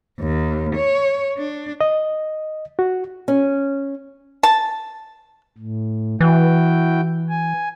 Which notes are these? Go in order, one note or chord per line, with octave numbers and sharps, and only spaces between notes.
D#2
C#5
D4
D#5
F#4
C#4
A5
A2
E3 E4 F#4 G5
G#5